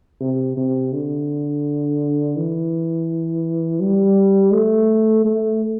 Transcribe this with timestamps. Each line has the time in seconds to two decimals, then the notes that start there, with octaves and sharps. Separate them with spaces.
0.21 C3
0.57 C3
0.93 D3
2.37 E3
3.81 G3
4.53 A3
5.25 A3